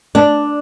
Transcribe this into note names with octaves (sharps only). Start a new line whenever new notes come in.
D4